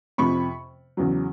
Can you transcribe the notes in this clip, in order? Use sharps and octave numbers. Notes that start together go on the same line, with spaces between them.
F2 C3 F3 B5 C#6
E2 C#3 F#3